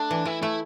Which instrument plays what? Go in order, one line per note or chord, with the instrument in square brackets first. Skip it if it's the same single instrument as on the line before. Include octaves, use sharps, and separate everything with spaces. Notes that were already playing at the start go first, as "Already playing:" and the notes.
Already playing: [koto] A3 [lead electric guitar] D4
[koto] E3
[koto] E3 [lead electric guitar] E4
[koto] A3 [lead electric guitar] E4